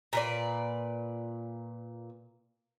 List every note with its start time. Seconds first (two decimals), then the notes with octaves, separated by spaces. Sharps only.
0.13 A#2 B4 D5